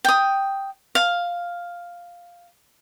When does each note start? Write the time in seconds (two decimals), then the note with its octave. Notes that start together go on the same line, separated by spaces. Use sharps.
0.05 G5 D#6
0.95 F5